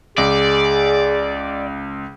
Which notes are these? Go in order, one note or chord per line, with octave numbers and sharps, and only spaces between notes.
C#2 G#4 D5